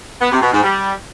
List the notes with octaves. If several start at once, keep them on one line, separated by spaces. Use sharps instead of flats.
B3
C3
B2
G#2
G3